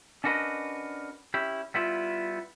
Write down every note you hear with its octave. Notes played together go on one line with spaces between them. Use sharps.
C#4 D4 F#4 A#4 B4 D#5
C#4 E4 G4
G3 B3 E4 F4